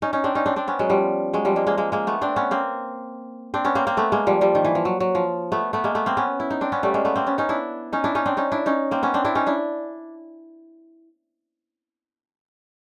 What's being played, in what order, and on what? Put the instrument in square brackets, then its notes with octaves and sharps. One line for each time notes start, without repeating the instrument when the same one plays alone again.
[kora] C#4 D#4
C#4 D#4
C4 D4
C#4 D#4
C4 D4
C4 D4
B3 C#4
F#3 G#3
F3 G3
F#3 G#3
F3 G3
G#3 A#3
G#3 A#3
G#3 A#3
G#3 A#3
A3 B3
C4 D4
B3 C#4
A#3 C4
C4 D4
B3 C#4
A#3 C4
A#3 C4
A3 B3
G#3 A#3
F3 G3
F3 G3
D#3
E3
F3
F#3
F#3
F3
A3 B3
A3 B3
G#3 A#3
A3 B3
A#3 C4
B3 C#4
E4
D#4
C4 D4
B3 C#4
G3 A3
G#3 A#3
A3 B3
A#3 C4
B3 C#4
C#4 D#4
D4 E4
C#4 D#4
D4 E4
C#4 D#4
C4 D4
C#4 D#4
D4 E4
C#4 D#4
A#3 C4
B3 C#4
C4 D4
D4 E4
C#4 D#4
D4 E4